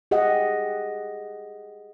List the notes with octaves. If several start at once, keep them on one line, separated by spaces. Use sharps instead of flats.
G4 G#4 D#5 F#5